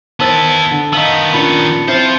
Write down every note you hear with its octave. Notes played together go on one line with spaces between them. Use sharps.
D#3 B3 E4 C5 A5 E6 A6
D3
D#3 B3 D#5 F5 E6
A#2 C#4 D4 B5 A6 C#7
C4 E4 F4 C5 G6